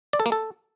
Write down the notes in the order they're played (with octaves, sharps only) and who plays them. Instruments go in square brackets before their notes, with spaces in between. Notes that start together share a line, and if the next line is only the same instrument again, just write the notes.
[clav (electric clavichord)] D5
A4
A#3
A4